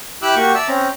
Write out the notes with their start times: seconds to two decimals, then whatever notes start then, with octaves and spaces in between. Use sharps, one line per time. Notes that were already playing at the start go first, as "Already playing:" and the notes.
0.22 E4 G4 D6 E6 F#6
0.36 A#3 F#4 G4 C#6
0.55 D5 E5 A5 E6
0.68 C4 C#4 A#5